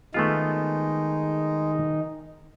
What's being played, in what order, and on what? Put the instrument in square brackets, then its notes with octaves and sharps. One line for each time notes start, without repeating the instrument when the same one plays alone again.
[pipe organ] D#3 D#4 [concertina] G#3 [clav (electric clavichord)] A3 B3 F4